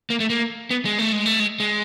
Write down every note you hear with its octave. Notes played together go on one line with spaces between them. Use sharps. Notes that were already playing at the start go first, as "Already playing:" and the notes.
A#3
A3
A#3
B3
G#3
A3
G#3
A3
G#3
G#3